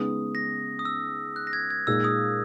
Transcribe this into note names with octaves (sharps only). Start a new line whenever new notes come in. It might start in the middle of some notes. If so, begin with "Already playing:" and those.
Already playing: C#3 G#3 B3 D#4 D#6
A#6
D#6
E6
F#6
A#6
G#6
G#6
A#2 G#3 D#4 E6
D#6